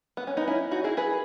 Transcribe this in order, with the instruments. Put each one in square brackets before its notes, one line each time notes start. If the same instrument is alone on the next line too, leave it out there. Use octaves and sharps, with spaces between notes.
[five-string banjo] B3
C#4
B3 D#4
C#4 E4
D#4 F#4
E4 G#4
G#4 B4